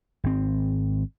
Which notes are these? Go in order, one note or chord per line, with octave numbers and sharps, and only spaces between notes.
G#1 C4